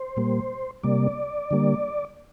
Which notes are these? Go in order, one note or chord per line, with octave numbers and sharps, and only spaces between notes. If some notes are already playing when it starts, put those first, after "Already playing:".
Already playing: C5
A#2 G3 A#3
C3 G3 A#3 D5
D3 G3 A#3